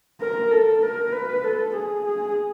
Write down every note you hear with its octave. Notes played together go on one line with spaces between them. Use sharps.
A#4
A4
A#4
B4
A4
G#4
G#4